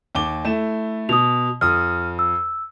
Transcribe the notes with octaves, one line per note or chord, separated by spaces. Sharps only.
D#2 D6 G7
A3 E4 E7
B2 D#6 F7
F2 D#6 F6
E6